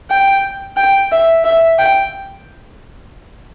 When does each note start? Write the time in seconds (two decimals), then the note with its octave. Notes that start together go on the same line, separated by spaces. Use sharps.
0.10 G5
0.77 G5
1.12 E5
1.44 E5
1.79 G5